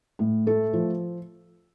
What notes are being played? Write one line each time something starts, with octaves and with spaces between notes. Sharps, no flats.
A2
A3 A4
F3